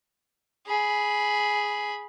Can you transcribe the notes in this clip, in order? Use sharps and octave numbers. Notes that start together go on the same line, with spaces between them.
G#4 B5